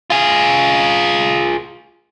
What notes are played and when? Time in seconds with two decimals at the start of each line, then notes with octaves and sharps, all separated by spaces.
0.10 F4 G#4